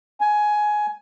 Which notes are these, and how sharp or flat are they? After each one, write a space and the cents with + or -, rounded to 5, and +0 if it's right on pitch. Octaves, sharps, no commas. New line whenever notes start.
G#5 +15